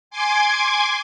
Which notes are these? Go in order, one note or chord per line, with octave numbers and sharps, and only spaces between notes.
G#5 C6 D6 G#6